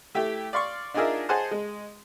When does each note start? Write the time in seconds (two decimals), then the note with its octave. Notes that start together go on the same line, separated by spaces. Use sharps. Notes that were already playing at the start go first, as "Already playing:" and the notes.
0.15 A3 E4 G4
0.53 D5 F5 C6 C#6
0.94 D4 D#4 F4 G#4 A#4 E5
1.29 G#4 C5 D#5 F#5 G#5 A5
1.51 G#3